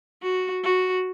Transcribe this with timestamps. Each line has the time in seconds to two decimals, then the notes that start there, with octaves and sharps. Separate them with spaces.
0.22 F#4
0.64 F#4